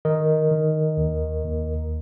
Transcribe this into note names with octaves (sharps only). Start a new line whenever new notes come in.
D#3 A#4 D#5
D#3
D#2
D#2